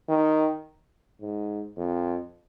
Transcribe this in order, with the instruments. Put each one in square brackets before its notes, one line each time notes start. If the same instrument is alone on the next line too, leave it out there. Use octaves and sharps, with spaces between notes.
[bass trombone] D#3
G#2
F2